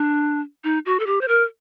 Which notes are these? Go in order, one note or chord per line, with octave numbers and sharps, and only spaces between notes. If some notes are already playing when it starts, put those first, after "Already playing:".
Already playing: D4
D#4
F#4
A4
G4
C5
A#4